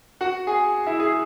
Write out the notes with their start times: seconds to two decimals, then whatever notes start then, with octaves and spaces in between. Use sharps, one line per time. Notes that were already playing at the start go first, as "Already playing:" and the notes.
0.21 F#4 F#5
0.47 G#4 G#5
0.87 E4 E5
1.00 G#4